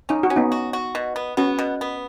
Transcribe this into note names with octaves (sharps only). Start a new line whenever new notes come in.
C#4 D#4
F#4
C#4
B3 D#4
F#4
F#4
B2
B3
B3 C#4 F#4
B2
B3